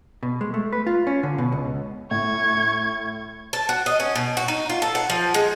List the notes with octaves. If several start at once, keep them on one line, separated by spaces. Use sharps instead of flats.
B2
G#3
A3
B4
F4
C#4
D3
B2
C#2
A2 C#6 G#6
A5
F#4
D#5
C#4
B2
F#4
D#4
F4
A4
F#5
F3
G#3